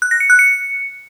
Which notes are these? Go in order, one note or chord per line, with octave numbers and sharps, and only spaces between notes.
F#6
A#6
C#7
F#6
C#7